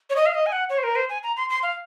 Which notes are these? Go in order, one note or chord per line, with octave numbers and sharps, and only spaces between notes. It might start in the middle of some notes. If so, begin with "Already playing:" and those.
C#5
D#5
F5
D#5
G#5
F#5
C#5
C5
A#4
C5
G#5
A#5
C6
C6
F5